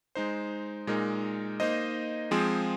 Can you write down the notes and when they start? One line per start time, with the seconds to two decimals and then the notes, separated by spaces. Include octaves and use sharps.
0.15 G#3 D#4 C5
0.87 A#2 G#3 D#4 A#4
1.60 A#3 D#4 C5 D#5
2.31 F3 G#3 C4 G#4